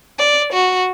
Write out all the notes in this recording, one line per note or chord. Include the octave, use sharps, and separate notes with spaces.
D5
F#4